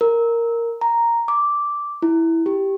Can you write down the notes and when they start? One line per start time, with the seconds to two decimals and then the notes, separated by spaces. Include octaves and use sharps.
0.01 A#4
0.81 A#5
1.28 D6
2.02 E4
2.46 G4